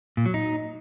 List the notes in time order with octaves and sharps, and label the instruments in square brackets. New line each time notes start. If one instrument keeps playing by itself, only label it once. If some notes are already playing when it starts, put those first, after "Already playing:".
[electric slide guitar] A#2
F#3
D#4